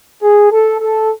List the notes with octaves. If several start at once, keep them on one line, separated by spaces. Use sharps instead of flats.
G#4
A4
A4